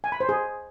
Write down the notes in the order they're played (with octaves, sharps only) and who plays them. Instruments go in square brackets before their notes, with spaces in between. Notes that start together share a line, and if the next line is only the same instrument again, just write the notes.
[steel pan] G#5
B5
C5
G#4